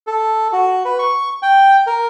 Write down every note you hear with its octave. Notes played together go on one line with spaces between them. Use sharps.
A4
F#4
B4
C#6
G5
A#4